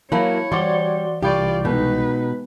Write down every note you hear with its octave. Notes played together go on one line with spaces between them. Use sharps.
F#3 A#3 E4 C#5 F5 A5 B5
E3 G3 F#4 C5 D5 C6 G7
C2 E3 F4 G4 D5 B5 C#6 G6
B2 G#3 D#4 F#4 B4